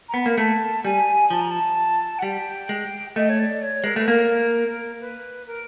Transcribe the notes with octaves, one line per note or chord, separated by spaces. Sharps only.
A#5
B3 B5
A#3
A3 A5
G3 G#5
F3 A5
A#5
A5
F#5
G3 G5
G#3
A3 D#5
C#5
D5
C#5
G#3 A#4
A3 B4
A#3 A#4
B4
A#4